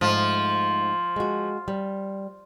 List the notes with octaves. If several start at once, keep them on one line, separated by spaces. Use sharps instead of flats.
G#2 F3 A3
G#3 F#4
G3